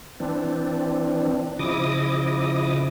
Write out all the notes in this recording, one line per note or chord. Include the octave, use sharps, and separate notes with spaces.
E3 C4 D4
C#3 F3 E4 D#5 D6 D#6